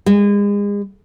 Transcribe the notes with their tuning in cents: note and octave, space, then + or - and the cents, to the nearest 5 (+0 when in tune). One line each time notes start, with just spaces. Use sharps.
G#3 -35